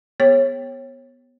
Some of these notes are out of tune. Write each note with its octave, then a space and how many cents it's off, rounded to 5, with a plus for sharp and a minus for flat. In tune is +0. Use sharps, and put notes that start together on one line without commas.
B3 +0 G#4 +0 C#5 -30